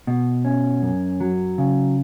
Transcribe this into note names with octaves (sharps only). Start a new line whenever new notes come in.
B2
C#4
F#2
F#3
C#3